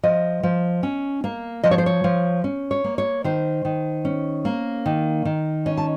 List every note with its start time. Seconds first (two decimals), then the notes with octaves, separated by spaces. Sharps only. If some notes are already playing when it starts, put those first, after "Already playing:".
0.03 F3 D#5
0.43 F3
0.83 C#4
1.24 A#3
1.63 F3 D#5
1.71 C#5
1.78 C5
1.86 C#5
2.04 F3
2.44 C#4
2.71 C#5
2.84 A#3
2.98 C#5
3.24 D#3 C5
3.65 D#3
4.05 C#4
4.45 A#3
4.86 D#3
5.25 D#3
5.66 C#4 D#5
5.77 A5